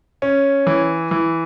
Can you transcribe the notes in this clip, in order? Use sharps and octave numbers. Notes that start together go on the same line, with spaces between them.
C#4
E3
E3